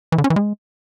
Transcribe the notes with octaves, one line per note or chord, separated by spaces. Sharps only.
E3
D3
C#4
E3
G#3